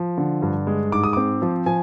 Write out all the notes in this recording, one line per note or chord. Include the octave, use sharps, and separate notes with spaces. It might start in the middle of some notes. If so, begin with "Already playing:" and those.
Already playing: F3
D3
G2
G#3
G#2 D6
D#6
C4 D6
F3
F3 G#5